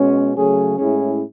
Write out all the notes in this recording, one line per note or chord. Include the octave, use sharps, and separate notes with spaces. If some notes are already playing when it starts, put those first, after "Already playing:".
Already playing: B2 G#3 C#4
C#3 F#3 A3 C#4 G#4
A2 G#3 C#4 E4 G#4